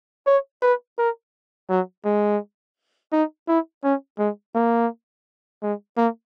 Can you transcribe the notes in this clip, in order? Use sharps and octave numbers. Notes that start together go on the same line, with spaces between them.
C#5
B4
A#4
F#3
G#3
D#4
E4
C#4
G#3
A#3
G#3
A#3